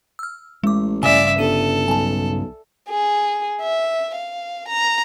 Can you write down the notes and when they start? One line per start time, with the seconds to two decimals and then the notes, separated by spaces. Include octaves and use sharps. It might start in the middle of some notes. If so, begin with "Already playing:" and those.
0.19 E6 F6
0.64 A1 G#3 D6
1.03 G2 C#3 D5 E5 G#5
1.38 G1 A4 D#7
1.88 B1 G#5 A5
2.90 G#4
3.61 E5
4.15 F5
4.69 A#5